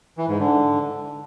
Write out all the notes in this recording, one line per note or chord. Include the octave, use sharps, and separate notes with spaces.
E3
G#2
D3